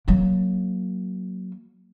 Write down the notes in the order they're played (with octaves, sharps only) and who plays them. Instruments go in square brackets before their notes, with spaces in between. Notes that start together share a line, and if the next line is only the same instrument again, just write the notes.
[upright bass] F#3 A#3